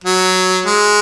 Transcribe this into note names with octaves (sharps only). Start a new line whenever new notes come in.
F#3
G#3